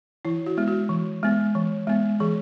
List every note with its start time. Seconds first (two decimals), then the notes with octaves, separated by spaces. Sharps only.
0.25 E3 E4
0.46 F#4
0.57 G#3 B3
0.68 F#4
0.89 E3
1.23 G#3 B3
1.55 E3
1.87 G#3 B3
2.20 E3 G#4